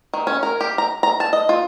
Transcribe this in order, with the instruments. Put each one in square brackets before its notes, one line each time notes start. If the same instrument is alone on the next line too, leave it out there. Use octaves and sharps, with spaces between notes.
[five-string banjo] D#3
C#4
A#4
G4
A#5
A#5
A5
D#5
F4